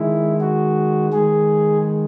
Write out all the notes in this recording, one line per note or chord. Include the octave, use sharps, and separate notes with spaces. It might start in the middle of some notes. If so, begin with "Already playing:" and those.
Already playing: D#3 G#3 E4
F#4
D#3 G#3 G#4